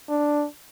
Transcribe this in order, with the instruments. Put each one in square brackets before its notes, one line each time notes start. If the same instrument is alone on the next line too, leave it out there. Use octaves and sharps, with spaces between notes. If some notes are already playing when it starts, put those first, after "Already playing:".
[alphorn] D4